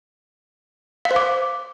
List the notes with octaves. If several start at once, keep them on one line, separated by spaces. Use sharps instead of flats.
F5
C5
D6